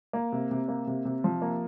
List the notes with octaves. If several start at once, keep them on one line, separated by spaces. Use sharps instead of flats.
A#3
C3
C3
A#3
C3
C3
F3
A#3